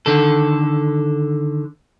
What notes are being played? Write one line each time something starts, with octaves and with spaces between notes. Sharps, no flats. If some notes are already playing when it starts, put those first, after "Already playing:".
D3 D#3 A4